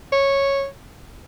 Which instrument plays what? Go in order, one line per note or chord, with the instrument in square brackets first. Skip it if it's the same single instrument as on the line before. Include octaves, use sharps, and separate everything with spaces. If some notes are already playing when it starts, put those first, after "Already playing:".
[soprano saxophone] C#5